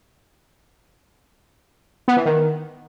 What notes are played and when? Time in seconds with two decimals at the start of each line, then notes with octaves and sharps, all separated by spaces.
2.08 B3
2.17 E3
2.26 D#3